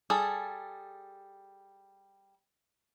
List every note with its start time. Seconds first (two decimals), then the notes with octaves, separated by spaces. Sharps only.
0.10 G3 G#4 A4